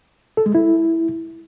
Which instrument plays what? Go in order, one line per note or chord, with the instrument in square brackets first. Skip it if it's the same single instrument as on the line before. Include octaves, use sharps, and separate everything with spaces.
[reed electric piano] A4
G#3
E4